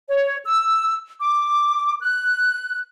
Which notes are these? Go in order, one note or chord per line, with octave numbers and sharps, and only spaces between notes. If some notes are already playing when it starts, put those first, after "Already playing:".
C#5
E6
D6
F#6